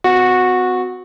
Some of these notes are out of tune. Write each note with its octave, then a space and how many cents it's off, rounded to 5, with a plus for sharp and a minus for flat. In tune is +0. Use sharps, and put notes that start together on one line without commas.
C4 -45 F#4 -15